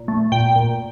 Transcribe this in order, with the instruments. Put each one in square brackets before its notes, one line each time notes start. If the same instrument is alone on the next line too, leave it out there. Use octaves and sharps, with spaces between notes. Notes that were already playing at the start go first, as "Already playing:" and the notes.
Already playing: [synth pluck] A#2
A3
A#2 G5
A#2